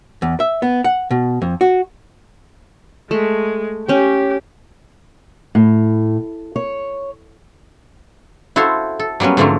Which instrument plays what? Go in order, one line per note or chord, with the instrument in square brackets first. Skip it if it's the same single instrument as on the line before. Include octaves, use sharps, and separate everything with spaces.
[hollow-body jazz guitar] E2
E5
B3
F#5
B2
F2
F#4
[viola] G#3 [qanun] A3
[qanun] C#4 G5 [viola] G4
[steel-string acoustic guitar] A2
C#5
[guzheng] E4 F#4 A4 C5 F5
A4
F#3 G3 A#3 B3 C#4
G#2 D3 F3 F#3 A3 A#3